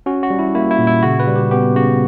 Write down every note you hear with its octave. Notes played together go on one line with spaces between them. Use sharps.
C#4 F#4
F#4
G3
E4
A#3 E4
E4
A#2
E4
C#3 F#4
B4
G3
G4
B3 G4
C#3 F#4